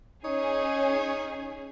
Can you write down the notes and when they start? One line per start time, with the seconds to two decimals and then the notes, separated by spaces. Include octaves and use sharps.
0.24 C#4 D#4 G#4 C#5